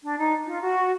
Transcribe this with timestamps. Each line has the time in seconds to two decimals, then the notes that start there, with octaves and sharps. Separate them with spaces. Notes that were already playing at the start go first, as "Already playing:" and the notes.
0.03 D4
0.18 D#4
0.46 F4
0.61 F#4